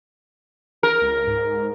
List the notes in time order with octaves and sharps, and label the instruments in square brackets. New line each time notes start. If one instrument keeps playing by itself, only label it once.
[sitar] A#4
[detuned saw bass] C#2
G#2